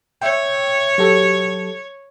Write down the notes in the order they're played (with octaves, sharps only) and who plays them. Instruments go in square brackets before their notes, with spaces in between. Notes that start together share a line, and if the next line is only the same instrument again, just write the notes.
[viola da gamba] C#5 [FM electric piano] E5 G5
[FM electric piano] F#3 G4 A4